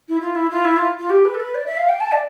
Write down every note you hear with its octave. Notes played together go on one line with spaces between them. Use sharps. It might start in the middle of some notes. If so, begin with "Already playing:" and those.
E4
F4
E4
F4
E4
F4
F4
G4
B4
A4
B4
D5
E5
F5
G5
A5
D5